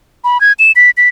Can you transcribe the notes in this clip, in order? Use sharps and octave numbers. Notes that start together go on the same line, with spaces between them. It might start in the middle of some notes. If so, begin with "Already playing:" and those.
B5
G#6
E7
B6
B6